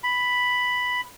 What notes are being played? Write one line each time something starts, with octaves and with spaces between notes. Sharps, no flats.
B5